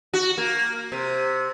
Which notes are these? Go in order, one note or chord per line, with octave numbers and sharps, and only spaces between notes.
F#4
A#3
C3